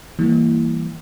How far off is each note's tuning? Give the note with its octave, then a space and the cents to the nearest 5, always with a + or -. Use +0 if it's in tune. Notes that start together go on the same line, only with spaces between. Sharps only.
E3 +0 G3 +0 A#3 -10